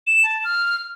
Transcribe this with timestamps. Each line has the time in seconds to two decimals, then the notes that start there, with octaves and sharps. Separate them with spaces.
0.07 E7
0.23 A5
0.44 F6